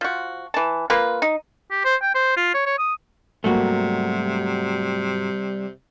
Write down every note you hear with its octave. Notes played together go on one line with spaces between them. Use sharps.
F3 F#4
E3 A5
A#3 F4 B4
D#4
G4
C5
G5
C5
F4
C#5
C#5
D#6
G#2 C3 F#3 G3 A3 A#3 F#4